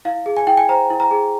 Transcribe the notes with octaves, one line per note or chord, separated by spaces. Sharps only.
E4 F5
G#4
G#5
E4 G5
G#5
C5 A#5
E4
A#5
G#4